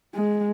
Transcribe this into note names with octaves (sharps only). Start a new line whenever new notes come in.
G#3